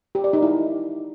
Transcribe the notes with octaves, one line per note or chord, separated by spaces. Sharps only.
G4
D5
D#4
E4